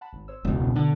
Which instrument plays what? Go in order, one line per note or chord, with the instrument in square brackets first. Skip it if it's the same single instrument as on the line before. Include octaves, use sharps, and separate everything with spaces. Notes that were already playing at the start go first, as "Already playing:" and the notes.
[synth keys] F#5 A5 B5
G#1
C5 C#5 E6
[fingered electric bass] E1 C#2 [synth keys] G#3
[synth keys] B2 B3 D4
[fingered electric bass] D3